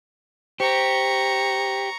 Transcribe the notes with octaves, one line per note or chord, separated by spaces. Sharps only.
G4 C5 A#5 C#6 C#7